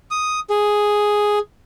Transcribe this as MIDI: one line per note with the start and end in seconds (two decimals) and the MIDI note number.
0.11 0.40 87
0.50 1.39 68